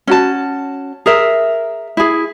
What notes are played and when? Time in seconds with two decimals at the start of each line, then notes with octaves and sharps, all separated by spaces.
0.07 C#4 F#4 A5
1.06 G#4 A#4 E5
1.97 E4 G#4